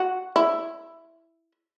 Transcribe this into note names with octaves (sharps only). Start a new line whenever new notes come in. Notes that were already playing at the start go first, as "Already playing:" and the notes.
Already playing: F#4
E4